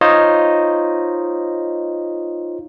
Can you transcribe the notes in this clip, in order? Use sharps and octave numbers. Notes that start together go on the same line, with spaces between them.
D#4 F4 C5 C#5 D#5